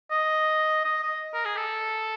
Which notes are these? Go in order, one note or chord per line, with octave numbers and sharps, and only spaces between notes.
D#5
D#5
D#5
A#4
G#4
A4